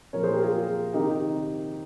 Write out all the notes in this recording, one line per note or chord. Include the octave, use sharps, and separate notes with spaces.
A#2 F3 A#4 C#5
G#4 C5
G4 A#4
F4 G#4
C3 D#3 D#4 G4